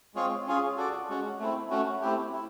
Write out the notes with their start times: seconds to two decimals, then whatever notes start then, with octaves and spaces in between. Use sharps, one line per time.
0.15 G#3 C4 F4 G#4 C#5
0.47 C#4 F4 G#4
0.77 F#4 A4 D5
1.09 G#3 C#4 F#4
1.39 A3 C4 E4
1.71 A3 C#4 F#4
2.02 A3 C4 E4 G4
2.33 E4